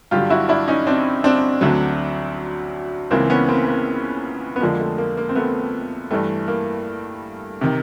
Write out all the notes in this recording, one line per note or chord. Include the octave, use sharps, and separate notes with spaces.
G2 D3 F#3 F4 G4
E4 F#4
D4 E4
C#4 D#4
C4 D4
C4 D4
D2 D3 F#3
C#2 C#3 E3 A#3 C4
B3 C#4
A#3 C4
A#3
B3
F2 D3 F3 G#3 A#3
A3
A#3
A#3
C4
A3 B3
G2 E3 G3 A3
A#3
C3 D#3